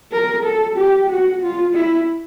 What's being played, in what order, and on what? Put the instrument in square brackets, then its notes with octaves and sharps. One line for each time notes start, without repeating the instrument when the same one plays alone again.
[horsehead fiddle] A#4
A4
G4
F#4
F4
E4